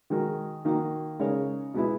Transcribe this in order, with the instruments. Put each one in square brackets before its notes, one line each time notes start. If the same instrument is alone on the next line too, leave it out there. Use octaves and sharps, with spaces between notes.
[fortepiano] D#3 G#3 D#4 F#4 A#4
D#3 A#3 D#4 F#4
C#3 G#3 D#4 A#4 C#5
B2 G#3 B3 E4